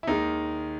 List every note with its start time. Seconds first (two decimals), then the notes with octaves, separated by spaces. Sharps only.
0.03 E4
0.07 D#2 D#3 G#3 D#4